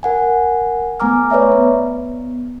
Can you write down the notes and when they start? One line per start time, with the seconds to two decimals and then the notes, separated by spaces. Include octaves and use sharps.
0.03 A#4 F#5 G#5
1.00 A3 B3 G#5 A#5 D6 F6
1.30 B4 C#5 D5 E5 A#5
1.52 B3